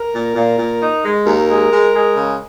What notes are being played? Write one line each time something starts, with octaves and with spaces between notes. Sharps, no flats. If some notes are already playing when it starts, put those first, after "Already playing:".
Already playing: A#4
A#2
A#2
A#2
D#4
G#3
D#2 A#4
G#3
G#3
G#3
C#3